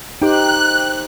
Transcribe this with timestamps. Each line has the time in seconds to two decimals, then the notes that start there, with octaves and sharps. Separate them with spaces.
0.22 D#4 G4 C5 G5 F#6